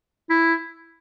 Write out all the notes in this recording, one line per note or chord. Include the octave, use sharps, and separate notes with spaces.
E4